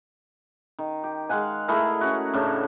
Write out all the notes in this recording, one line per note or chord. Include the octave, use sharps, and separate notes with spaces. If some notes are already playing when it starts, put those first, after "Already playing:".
D#3
G4
G#3 F5 F#5 G#5
A3 E4 G#4 A#4
C#4 F#4
A2 C#3 D4 A4